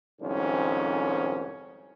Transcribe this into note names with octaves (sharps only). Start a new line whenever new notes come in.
C2 F2 G#2 D#3 C#4